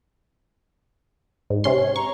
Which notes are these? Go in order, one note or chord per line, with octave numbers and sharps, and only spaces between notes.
G#2
C3 C#4 C6
C#5
A#5 C#6